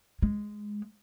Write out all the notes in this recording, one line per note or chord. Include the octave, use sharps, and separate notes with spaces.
G#3